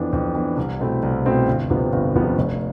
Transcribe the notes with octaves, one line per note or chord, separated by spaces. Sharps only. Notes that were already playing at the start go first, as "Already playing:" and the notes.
Already playing: F2 E3 B3 D4
F2
E3 B3 D4
C2
B2 A3 C4 E4
C2
B2 A3 C4 E4
G1
F2 C3 F3 B3
G1
F2 C3 F3 B3
F1